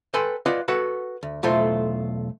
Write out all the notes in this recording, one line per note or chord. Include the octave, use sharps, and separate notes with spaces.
A4 B4 G5 G#5 C6
F4 B4 D5 D#5 F#5
F#4 A4 B4 F#5
D2
B1 E2 A3 F4 A4 C5